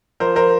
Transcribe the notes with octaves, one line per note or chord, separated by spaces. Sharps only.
F3 A#4 C5
A#4 C5